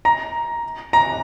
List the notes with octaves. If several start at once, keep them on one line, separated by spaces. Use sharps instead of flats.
A#5
A#5